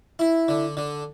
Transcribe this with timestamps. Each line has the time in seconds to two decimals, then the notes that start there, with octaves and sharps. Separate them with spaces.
0.19 E4
0.48 D3
0.77 D3